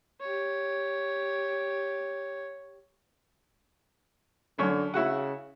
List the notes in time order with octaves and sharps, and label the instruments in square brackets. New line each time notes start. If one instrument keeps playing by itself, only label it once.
[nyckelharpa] G4 C#5
[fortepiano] F#2 C#5 [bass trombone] D3
[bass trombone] C#3 [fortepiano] E4 F#4 F#5